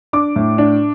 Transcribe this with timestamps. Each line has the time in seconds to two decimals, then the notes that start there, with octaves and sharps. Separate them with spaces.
0.13 D4 D6
0.36 A2
0.58 D4